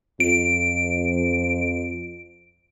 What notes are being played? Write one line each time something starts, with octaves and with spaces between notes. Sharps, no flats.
F2 D7